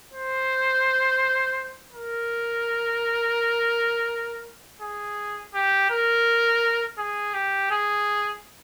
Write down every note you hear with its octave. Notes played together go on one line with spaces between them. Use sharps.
C5
A#4
G#4
G4
A#4
G#4
G4
G#4